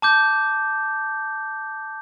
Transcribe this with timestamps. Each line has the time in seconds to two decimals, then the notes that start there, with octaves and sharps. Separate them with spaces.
0.02 A5 D6 G6